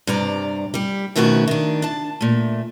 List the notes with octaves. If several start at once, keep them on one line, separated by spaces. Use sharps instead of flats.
G2 C3 D5 A#5
G3 G4
F2 B2 D#3 A3 C#4 F#4
D#3 D4
D4 A5
A#2 A3